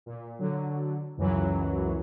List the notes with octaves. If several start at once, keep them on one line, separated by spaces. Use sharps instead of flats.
A#2
D3 F#3
C#2 F#2 E3 F#3